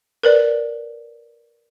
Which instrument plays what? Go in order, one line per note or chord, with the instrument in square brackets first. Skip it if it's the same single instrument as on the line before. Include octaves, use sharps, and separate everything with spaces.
[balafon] A#4 B4 D5